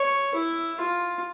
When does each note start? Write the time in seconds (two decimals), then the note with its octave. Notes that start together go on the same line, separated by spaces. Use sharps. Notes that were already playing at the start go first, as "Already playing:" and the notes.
Already playing: C#5
0.35 E4
0.80 F4